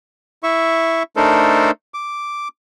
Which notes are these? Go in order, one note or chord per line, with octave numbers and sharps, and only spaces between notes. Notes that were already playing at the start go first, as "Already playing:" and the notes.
E4 E5 C#6
A3 D4 D#4 A4 A#4 C5
D6